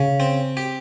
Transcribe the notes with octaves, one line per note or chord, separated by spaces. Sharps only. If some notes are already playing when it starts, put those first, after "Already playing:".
Already playing: C#3
C4
G4